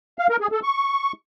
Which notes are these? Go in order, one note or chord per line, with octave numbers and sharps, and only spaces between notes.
F5
A#4
G#4
A4
C#6